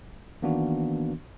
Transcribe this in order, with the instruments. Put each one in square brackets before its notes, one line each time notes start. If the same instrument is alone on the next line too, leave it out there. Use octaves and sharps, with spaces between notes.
[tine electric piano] D#3 E3 A#3 B3 D4 F#4